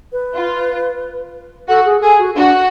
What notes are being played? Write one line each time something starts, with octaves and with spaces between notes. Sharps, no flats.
B4
F4
F#4 A4
G#4
G#4 A4
F#4
D4 F#4